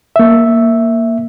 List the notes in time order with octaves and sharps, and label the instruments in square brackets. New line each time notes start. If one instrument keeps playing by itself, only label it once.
[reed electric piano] A#3 E5